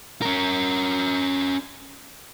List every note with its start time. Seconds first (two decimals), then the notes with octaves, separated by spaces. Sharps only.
0.22 C#4 A#4